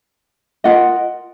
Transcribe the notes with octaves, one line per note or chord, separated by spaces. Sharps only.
F4 A#4 D#5 F#5